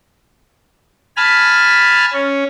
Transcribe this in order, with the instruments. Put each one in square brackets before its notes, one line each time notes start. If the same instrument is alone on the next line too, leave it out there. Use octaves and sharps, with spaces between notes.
[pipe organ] G#5 A5 B5 F6
C#4